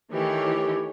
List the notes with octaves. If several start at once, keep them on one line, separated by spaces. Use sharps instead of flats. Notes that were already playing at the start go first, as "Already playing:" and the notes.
D#3 E3 A3 G4 C#5